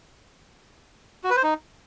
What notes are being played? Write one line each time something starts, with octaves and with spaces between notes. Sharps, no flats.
F#4
B4
C5
D#4